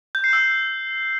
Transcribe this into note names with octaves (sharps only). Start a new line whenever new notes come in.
G6
C7
E6